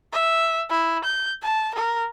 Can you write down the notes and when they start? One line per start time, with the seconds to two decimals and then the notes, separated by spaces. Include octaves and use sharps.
0.13 E5
0.70 E4
1.04 G6
1.43 A5
1.74 A#4